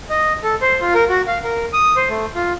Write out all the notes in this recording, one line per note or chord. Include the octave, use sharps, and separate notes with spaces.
D#5
A4
C5
F4
A#4
F#4
F5
A#4
D#6
C5
A3
F4